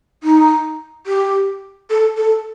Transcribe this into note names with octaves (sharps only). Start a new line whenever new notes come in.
D#4
G4
A4
A4